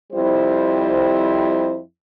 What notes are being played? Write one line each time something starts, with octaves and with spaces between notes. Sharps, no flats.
F2 G3 E4 C5